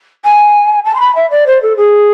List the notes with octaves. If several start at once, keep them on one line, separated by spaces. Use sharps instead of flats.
G#5
A5
C6
B5
E5
D5
C5
A4
G#4